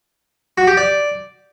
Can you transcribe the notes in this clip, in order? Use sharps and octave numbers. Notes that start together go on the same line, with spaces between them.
F#4
G4
D5